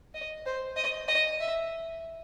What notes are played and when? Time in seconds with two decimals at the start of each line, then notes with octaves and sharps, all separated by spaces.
0.14 D#5
0.46 C5
0.76 D#5
1.08 D#5
1.40 E5